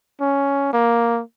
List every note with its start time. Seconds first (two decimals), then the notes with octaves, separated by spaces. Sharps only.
0.21 C#4
0.73 A#3